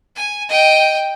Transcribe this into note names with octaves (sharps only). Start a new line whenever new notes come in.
G#5
D#5 G5